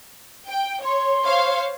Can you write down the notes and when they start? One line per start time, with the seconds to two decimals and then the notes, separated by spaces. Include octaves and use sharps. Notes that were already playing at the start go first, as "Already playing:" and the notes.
0.48 G5
0.84 C#5 C6
1.24 C5 C#5 F5